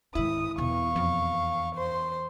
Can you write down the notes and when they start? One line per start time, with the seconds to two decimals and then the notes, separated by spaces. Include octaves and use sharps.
0.15 G#2 D#3 E4 D#6
0.58 E2 B2 F5 C#6
0.96 F2
1.76 C5 C6